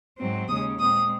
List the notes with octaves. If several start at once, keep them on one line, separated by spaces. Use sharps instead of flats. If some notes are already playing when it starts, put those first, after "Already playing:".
G#2 F#3 C4
D#2 C#3 G#3 C#4 D#6
A#2 G#3 C4 D#6